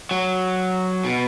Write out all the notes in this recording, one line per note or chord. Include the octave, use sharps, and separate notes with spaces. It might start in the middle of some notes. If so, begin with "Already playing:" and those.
F#3
B2